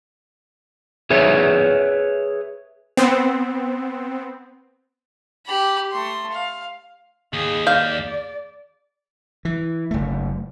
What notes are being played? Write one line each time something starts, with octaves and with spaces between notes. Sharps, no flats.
G#4 B4 C#5 E5
B3 C4
G4 B5
A3 C6
F5
D#2 G#4
D5 F5 G6
E3
F#1 A3